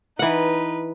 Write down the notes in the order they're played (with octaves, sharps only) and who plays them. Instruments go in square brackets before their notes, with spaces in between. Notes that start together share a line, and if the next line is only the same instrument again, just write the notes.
[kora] E3 F#5 [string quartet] D#4 B4